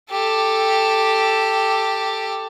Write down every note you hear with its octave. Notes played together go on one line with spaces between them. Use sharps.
G4 A4